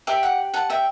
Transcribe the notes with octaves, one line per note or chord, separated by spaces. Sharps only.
G4 D5 E5
F#5
F#5 A5
E5 G5